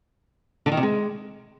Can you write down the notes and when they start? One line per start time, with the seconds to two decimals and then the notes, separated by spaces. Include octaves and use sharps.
0.66 D3
0.72 D#3
0.77 C3
0.83 G#3